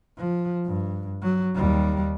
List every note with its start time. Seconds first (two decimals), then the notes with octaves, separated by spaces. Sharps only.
0.18 F3
0.66 G2
1.23 F#3
1.55 D#2 G3